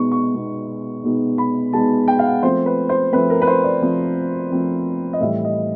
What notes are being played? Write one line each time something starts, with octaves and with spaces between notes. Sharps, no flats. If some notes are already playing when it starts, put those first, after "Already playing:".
Already playing: B2 G#3 B3 D#4 C#6
C#6
B2 G#3 B3 D#4
B2 G#3 B3 D#4
B5
B2 G#3 B3 D#4 A5
G5
F5
F#5
F3 A3 C4 C5
B4
C5
F3 A3 C4 B4
A#4
B4
C5
D5
F3 A3 C4
F3 A3 C4
D#5
A2 E3 G3 E5
D#5